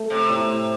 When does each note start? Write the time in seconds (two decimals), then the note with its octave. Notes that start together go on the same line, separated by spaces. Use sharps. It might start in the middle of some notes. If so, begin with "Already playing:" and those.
Already playing: A3
0.10 C3
0.29 A2